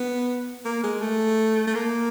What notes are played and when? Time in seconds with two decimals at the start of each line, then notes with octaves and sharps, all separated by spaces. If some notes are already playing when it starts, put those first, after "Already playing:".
Already playing: B3
0.65 A#3
0.83 G#3
1.02 A3
1.67 A3
1.75 A#3